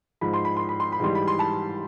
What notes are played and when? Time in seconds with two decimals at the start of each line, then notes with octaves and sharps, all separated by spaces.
0.21 G#2 F3 B5
0.34 C6
0.45 B5
0.57 C6
0.69 B5
0.80 C6
0.92 B5
1.00 G#2 E3 G3 C6
1.15 B5
1.28 C6
1.39 A5 B5